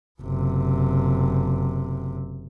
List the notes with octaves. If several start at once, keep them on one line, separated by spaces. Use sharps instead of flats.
F#1 C3